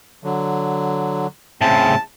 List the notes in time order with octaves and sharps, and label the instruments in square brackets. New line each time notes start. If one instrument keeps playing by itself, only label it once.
[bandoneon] D3 F#3
[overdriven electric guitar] A2 C#3 [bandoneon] C4 [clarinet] A5